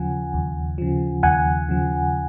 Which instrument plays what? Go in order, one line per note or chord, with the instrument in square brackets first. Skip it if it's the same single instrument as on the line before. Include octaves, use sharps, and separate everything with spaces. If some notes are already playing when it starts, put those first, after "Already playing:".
Already playing: [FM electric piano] D#2 C#3 F3 F#5 G#5
D#2
C#3 F3
D#2 F#5 G#5
C#3 F3